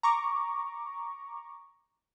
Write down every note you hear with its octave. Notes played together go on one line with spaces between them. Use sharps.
A#5 C#6 D6